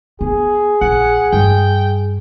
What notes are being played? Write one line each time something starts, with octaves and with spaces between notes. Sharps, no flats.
B3 G#4
A#1 F#5
G2 G3 G5